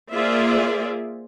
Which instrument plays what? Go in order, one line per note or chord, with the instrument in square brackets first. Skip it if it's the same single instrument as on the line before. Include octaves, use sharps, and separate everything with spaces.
[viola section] A#3 F4 G#4 C5 D5 E5